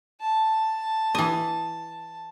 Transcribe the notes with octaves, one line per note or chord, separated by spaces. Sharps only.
A5
E3 D#5